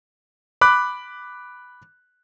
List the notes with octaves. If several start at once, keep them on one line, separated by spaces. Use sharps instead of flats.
B5 D6 F#6